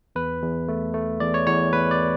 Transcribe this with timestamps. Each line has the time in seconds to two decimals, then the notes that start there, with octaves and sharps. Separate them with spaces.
0.16 E2 B4
0.42 E2
0.68 A3
0.94 A3
1.20 E2 D5
1.34 C#5
1.47 E2 C#5
1.73 E2 B4
1.91 D5